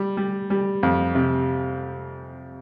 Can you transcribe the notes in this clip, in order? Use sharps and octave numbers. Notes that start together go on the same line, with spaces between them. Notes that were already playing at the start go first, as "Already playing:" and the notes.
Already playing: G3
G3
G3
F2
C3